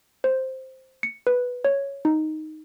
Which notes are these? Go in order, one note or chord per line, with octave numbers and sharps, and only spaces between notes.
C5
C#7
B4
C#5
D#4